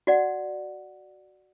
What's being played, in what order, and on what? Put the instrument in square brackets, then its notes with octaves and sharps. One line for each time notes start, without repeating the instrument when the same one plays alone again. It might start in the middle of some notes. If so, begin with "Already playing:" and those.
[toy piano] F#4 D5 F#5